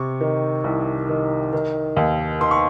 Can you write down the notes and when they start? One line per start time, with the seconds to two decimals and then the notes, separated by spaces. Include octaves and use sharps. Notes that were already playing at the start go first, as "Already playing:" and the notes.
Already playing: C3 C#6
0.21 D#3
0.64 C2
1.09 D#3
1.53 D#3
1.96 D#2
2.41 D#3 C6
2.51 C#6